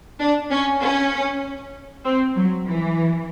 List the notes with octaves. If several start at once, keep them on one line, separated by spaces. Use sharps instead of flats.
D4
C#4
C#4
C4
F#3
E3